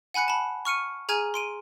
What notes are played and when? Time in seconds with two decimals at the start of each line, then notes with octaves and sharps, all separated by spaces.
0.14 F#5 G#5 B5 F#6 C#7
0.28 A5 B5
0.65 C#6 F6 C#7 D#7
1.09 G#4 G#5 A#5 F6 G#6 D#7
1.34 C6 D7 D#7